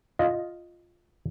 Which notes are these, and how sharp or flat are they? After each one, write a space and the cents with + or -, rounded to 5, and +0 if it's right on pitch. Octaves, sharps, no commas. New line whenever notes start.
F4 +0 D#5 +0